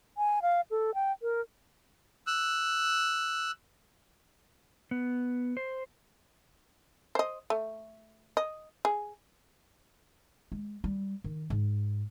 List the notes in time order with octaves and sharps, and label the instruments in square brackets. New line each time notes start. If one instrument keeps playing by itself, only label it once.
[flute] G#5
F5
A4
G5
A#4
[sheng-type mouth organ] E6 F#6
[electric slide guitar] B3
C5
[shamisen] C5 D#5
A3
D#5
G#4
[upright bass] G#3
G3
D#3
G#2